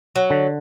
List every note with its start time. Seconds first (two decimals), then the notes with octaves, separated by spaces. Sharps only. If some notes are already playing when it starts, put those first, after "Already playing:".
0.16 F#3
0.30 D3